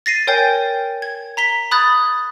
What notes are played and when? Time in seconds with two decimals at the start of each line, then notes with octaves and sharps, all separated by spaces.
0.06 A6 A#6 C7 D#7
0.27 A#4 C#5 G5 G#5 G6 A6
1.02 G#6
1.37 A#5 B6 G7
1.71 B5 D#6 F#6 G#6 A6